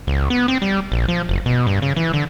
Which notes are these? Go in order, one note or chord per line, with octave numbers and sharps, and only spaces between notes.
C#2
B3
C4
G3
A#1
F3
F#1
B2
G2
C#3
E3
D3